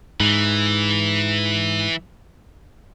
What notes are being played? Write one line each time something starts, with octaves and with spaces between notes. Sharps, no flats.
G#2 E3